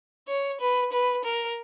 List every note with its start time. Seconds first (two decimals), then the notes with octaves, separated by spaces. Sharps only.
0.28 C#5
0.61 B4
0.93 B4
1.25 A#4